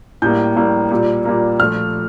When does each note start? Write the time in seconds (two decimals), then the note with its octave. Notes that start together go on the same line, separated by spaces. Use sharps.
0.22 A2 G3 A#3 G6
0.56 A2 G3 A#3
0.90 A#2 G3 A#3
1.25 A#2 G3 A#3
1.60 A#2 F3 A3 F6